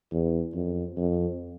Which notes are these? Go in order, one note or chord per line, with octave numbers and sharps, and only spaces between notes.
E2
F2
F2